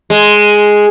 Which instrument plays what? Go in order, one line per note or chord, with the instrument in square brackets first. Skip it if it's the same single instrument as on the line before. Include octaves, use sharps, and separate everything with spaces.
[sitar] G#3